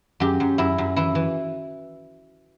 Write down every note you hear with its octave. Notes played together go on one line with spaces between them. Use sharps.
F#2 G4
F#2
F#2 E4
F#2
E3 E4
E3